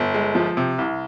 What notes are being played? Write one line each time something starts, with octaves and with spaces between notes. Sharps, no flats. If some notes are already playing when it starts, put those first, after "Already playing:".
Already playing: G1
G#3
F3
C3
C2